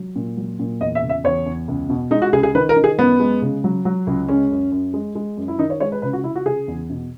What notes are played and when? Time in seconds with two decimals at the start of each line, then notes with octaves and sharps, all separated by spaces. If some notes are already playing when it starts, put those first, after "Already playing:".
Already playing: F#3
0.16 A#2
0.37 F#3
0.60 A#2
0.80 E2 D#5
0.95 E5
1.03 C#3
1.09 E5
1.24 E2 C#5
1.46 E2
1.68 C#2
1.89 B2
2.11 G#3 D#4
2.22 F#4
2.33 C#2 G#4
2.43 G#4
2.55 D#3 B4
2.69 A#4
2.76 D#3
2.84 G#4
2.98 F#2 B3
3.20 G#3
3.42 C#3
3.64 F#3
3.85 F#3
4.07 C#2
4.29 G#3 C#4
4.51 F#2
4.72 F#2
4.94 G#3
5.15 G#3
5.37 F#2
5.48 E4
5.59 D#3 D#4
5.70 C#5
5.80 G#3 C#5
5.92 B4
6.02 C#3 B4
6.13 F#4
6.24 C#3 E4
6.35 F#4
6.46 C#3 G#4
6.68 E2
6.90 B2